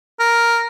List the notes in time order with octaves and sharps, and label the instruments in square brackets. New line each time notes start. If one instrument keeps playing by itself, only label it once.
[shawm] A#4